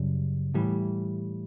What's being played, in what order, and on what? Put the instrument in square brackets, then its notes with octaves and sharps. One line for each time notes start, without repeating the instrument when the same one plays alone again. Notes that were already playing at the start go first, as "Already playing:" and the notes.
Already playing: [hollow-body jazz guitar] F#2 C#3 G3
A2 E3 G3